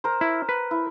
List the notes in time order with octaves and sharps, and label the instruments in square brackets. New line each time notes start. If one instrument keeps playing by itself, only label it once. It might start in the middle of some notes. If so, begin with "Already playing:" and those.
[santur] A#4 C5
[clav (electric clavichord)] E4
B4
[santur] E4